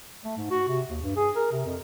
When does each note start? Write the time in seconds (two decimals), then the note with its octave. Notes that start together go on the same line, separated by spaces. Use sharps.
0.25 A3
0.37 G#2
0.51 F#4
0.68 C3
0.90 D#2
1.02 G2
1.17 G#4
1.36 A#4
1.52 C3
1.65 F2